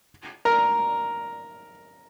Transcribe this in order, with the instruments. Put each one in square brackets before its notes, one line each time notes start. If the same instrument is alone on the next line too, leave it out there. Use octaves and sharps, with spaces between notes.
[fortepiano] A#4